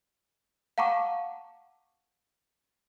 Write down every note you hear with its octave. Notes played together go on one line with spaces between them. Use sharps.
F5 F#5 A5 A#5 C#6 D6